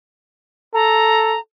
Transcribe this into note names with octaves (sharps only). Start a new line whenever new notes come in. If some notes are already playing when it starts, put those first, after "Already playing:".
A4 A#5